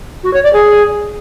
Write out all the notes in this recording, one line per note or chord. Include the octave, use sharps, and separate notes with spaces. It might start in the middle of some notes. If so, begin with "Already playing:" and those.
F#4
C#5
D5
G#4